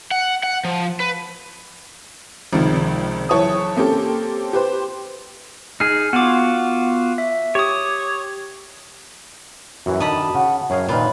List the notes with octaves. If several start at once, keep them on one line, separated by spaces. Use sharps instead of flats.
F#5
F#5
F3
B4
G#1 C#2 C3 D#3 F3
F#1 E3 C#5 A5 D#6
A#3 C4 C#4 G4 A4
G4 B4 C5
D#4 G#4 F6
B3 F4 F#4 D6
E5
G4 C#5 D#6
F#2 E3 F#4
D3 D#3 D#5 A5 B5
C#3 F#5
F#2 G#4 C#5 F5
A#2 D#3 F4 B4